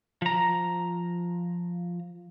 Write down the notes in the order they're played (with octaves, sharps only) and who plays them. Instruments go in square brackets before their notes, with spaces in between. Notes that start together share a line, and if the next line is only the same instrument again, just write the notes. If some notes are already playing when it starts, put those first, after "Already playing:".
[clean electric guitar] F3 A#5